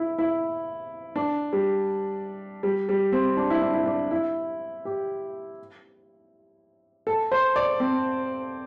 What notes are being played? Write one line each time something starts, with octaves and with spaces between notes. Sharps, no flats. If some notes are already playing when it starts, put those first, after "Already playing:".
Already playing: E4
E4
D4
G3
G3
G3
C4
D4
E4
D4
E4
D4
E4
G4
A4
C5
D5
C4